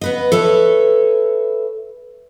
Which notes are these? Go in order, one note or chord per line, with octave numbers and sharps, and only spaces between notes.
B3 B4 D#5
A4 B4 C#5 E5